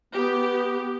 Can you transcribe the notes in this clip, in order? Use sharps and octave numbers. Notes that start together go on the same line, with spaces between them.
B3 G4